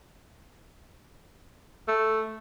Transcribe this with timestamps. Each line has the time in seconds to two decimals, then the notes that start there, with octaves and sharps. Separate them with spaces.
1.88 A3